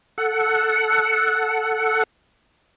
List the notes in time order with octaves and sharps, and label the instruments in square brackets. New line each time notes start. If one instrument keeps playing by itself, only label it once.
[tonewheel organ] A4 F#5